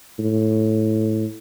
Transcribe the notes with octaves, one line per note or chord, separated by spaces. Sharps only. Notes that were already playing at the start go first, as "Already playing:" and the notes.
A2